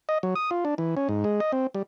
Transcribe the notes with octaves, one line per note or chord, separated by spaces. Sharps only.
D#5
F#3
D#6
F4
D4
E3
C#4
G#2
G#3
D#5
C4
G3